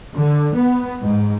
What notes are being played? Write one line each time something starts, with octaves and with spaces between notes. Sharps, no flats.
D3
B3
G#2